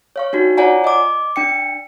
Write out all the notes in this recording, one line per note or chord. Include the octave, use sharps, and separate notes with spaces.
C#5 F5 C#6
D4 D#4 F#4
F4 C#5 D5 F#5 G#5 A#5
D#5 D6
D4 G5 C#7